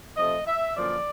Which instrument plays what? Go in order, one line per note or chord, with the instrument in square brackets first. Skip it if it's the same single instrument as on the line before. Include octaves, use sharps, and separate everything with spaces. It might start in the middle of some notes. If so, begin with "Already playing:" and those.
[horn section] C3 F3 A3 C4 D#5
E5
F#2 D3 F3 A#3 C#4 D5